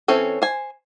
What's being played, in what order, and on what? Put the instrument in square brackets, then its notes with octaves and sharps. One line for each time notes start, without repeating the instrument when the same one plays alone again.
[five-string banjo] E3 C4 C#4 A4
C5 G#5